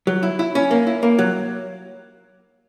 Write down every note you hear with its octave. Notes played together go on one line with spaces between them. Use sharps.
F#3
E4
E4
C#4
A#3
E4
A#3
F#3